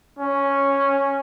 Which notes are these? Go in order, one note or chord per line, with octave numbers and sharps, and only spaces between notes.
C#4